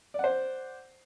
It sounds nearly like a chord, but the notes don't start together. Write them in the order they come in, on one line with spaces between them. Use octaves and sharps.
D5 F#5 C5